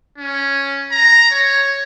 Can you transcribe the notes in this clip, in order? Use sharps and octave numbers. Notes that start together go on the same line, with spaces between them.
C#4
A#5
C#5